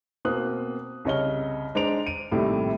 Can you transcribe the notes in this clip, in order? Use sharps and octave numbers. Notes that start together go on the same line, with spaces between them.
B2 A#3 C4 D#6 F#6
C2 C#3 C#5 D#5 F6 G7
G#3 D4 C5 A#5 D7 F7
D7 D#7
A#1 A2 C3 D#3 G3 A3